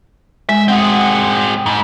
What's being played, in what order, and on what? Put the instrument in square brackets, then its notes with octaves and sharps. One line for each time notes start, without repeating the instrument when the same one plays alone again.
[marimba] G#3 [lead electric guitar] E5
[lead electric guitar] C4 G#4 [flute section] F#5 C6 D#6
[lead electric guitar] G#2 [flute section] B5